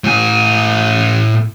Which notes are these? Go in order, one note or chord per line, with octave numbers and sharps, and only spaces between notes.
A2 G#5